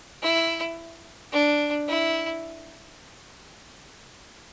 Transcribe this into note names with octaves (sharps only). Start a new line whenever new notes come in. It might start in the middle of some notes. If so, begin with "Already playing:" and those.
E4
D4
E4